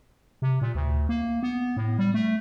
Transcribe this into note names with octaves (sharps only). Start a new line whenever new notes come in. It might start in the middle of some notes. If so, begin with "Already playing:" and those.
C3
A#2
D2
A#3
B3
A2
G3
A3